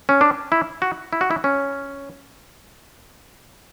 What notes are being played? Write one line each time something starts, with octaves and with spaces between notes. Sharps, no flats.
C#4
D4
E4
F#4
E4
F#4
E4
C#4